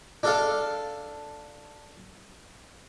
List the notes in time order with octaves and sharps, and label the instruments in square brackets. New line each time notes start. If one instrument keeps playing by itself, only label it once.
[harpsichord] D4 A4 F5